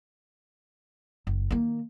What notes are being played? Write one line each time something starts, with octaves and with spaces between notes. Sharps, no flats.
F#1
D#3 A#3